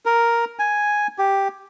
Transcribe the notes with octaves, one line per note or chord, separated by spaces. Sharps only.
A#4
G#5
G4